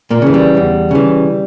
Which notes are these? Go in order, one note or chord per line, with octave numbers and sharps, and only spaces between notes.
A#2 A#3
C#3 E3
G3
E2
C#3 E3